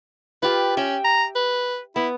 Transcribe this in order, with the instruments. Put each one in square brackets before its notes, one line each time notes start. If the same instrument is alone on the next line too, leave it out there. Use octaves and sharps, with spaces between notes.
[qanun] F4 G4 [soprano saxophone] B4
[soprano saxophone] C#4 [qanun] E5 G5
[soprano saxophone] A#5
B4
[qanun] B3 [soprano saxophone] E4